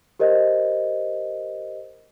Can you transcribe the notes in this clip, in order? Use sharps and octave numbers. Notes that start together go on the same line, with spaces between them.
G4 A#4 C5 D#5